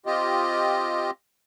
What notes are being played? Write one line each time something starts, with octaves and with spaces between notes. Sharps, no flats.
C4 F4 G4 D#5